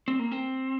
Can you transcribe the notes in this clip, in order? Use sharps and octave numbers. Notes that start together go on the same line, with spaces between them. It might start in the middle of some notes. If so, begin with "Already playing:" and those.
C4
A#3
C4